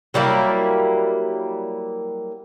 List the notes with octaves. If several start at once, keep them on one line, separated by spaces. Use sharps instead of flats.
F#3 G3 A#3 E4